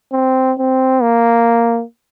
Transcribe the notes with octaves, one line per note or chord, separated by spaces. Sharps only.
C4
C4
A#3